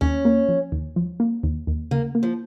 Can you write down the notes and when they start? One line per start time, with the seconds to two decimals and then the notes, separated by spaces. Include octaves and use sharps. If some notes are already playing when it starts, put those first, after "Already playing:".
0.01 D#2 C#4
0.25 A#3
0.49 F3
0.72 D#2
0.96 F3
1.20 A#3
1.43 D#2
1.67 D#2
1.91 C#3 A#3
2.15 A#3
2.23 F3